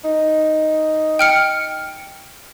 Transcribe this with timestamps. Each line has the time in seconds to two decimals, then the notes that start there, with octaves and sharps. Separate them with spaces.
0.04 D#4
1.19 G5 F6 C#7